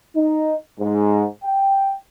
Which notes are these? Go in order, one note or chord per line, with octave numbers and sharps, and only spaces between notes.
D#4
G#2
G5